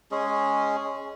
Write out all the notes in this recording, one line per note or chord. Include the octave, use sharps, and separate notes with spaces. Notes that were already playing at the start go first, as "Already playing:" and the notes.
G#3 C#4 G#4